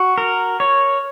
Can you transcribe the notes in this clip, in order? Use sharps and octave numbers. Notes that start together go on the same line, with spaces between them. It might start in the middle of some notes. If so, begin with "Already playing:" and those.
Already playing: F#4
A#4
C#5